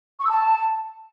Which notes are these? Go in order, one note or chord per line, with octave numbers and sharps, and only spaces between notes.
C#6
E6
A5